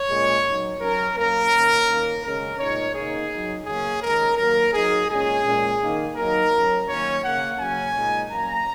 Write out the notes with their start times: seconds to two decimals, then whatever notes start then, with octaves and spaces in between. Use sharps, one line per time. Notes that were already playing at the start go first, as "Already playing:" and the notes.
Already playing: C#5
0.09 A#2 G#3 C#4
0.45 F#3 D#4
0.80 F#3 C#4 A#4
1.16 F#3 A#3 C#4 A#4
1.52 D#3 A#3 C#4
1.87 D#3 A#3 C#4
2.23 C#3 G#3 C#4 A#4
2.59 A#2 G#3 D#4 C#5
2.95 C#3 A#3 D#4 G#4
3.30 F#3 D#4
3.66 C#3 F#3 A#3 C#4 G#4
4.02 D#3 G#3 C#4 A#4
4.37 D#3 F#3 A#3 A#4
4.73 F#3 D#4 G#4
5.09 A#2 G#3 C#4 G#4
5.44 A#2 G#3 C#4
5.80 D#3 A#3 D#4
6.16 F#3 A#3 D#4 A#4
6.52 F#3 C#4
6.88 D#3 F#3 A#3 C#4 C#5
7.23 C#3 A#3 C#4 F#5
7.59 C#3 F#3 A#3 C#4 G#5
7.95 A#2 G#3 D#4
8.31 F#3 A#3 C#4 A#5